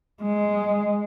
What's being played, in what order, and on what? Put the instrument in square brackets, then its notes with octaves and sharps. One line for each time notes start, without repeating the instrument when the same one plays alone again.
[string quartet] G#3